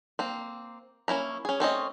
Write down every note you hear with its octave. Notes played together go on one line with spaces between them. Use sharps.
A#3 C4
A#3 C#4 E4 A#5
C#4 G#4
A3 C4 C#4 D#5